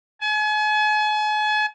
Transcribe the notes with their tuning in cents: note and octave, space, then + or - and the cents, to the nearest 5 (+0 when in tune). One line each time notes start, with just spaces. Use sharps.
G#5 +40